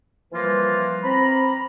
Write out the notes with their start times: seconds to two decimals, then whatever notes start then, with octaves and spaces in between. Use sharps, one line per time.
0.32 E3 F3 G3 A#3 F4 B4
1.03 C4 A#5 B5